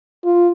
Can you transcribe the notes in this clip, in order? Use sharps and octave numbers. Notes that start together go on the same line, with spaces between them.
F4